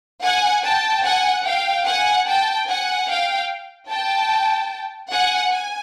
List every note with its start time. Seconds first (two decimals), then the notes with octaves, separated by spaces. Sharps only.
0.23 F#5 G#5
0.64 G5 A5
1.04 F#5 G#5
1.45 F5 G5
1.87 F#5 G#5
2.27 G5 A5
2.67 F#5 G#5
3.09 F5 G5
3.90 G5 A5
5.12 F#5 G#5
5.52 G#5